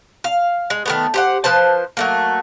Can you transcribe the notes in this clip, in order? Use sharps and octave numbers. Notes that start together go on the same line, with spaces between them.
F5
G#3
D#3 A3 B3
G4 C5 F#5
F3 B4 C5 A5
F#3 A3 A#3